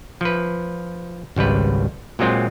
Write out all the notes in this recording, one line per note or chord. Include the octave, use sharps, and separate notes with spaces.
F3 B4
G#1 C#2 G3 B4
A#2 F#3 G#3 C4 F4